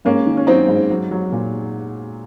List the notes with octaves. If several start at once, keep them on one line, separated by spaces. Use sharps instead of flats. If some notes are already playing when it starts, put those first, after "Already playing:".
G#2 A#3 C#4
D#3
C#4
F#3 C4 D#4
G#2
F#3
F#3
A#2